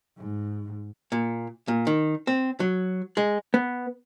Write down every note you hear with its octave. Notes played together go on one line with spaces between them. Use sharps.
G#2
A#2
A#2
D#3
C4
F#3
G#3
B3